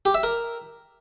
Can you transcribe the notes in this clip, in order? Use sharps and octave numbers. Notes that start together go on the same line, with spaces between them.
G4
E5
A#4